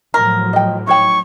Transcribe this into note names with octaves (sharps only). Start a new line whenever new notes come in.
A2 F3 F#3 A#4
D#5 G5
D#4 C#5 G5 C#6